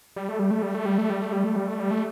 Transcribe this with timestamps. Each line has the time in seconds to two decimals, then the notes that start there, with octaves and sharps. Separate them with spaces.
0.16 G3
0.29 A3
0.39 G3
0.51 A3
0.62 G3
0.75 A3
0.86 G3
0.98 A3
1.10 G3
1.21 A3
1.32 G3
1.44 A3
1.56 G3
1.68 A3
1.80 G3
1.91 A3